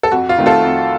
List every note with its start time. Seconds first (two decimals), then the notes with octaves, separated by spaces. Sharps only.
0.03 A4
0.12 F2 F#4
0.29 F4
0.38 D#3 A3 C4
0.46 F4 A4
0.63 F2